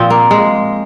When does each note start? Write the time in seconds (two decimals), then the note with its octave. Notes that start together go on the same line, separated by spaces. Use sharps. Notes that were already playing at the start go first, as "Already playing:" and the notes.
Already playing: A#2 F3 C4
0.10 A#3
0.31 G#3